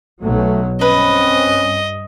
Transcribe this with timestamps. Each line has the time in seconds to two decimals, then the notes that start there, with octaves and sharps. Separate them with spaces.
0.23 B1 B2 F#3 A3
0.81 G2 C4 C#4 B4 D#5